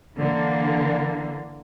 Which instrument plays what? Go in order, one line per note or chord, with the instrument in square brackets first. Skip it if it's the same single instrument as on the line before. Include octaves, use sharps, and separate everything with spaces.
[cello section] D3 E3 A#3